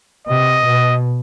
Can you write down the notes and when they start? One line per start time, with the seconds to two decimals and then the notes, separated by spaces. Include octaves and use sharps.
0.27 C3 D#5
0.65 B2